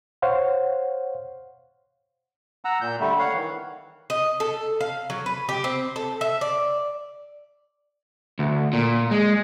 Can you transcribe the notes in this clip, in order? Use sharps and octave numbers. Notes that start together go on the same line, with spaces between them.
C5 C#5 F5 F#5
F#5 A#5 E6
A#2 G6
D3 G3 A3
C#5 F5 F#5
D#3 E3
D#5
A4
F5
F#3
B4
G4
C4
A4
E5
D5
D2
A#2
G#3